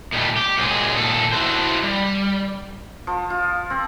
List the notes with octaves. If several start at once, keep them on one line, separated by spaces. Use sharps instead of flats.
A#2 D#3 G3 A3
G4
A#2 D#3 F#3 G#3 G#4
A#2 D#3 A4
E4 F#4 A4 C5
G3
F3
F4
C4